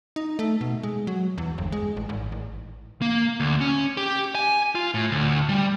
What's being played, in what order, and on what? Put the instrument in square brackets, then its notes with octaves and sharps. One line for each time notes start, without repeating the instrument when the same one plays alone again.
[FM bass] D#4
A3
B2
G#3
F#3
E2
G1
G#3
A1
G#1
A1
[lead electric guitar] A#3
D2
C#4
G4
G#5
F4
A2
D2
G3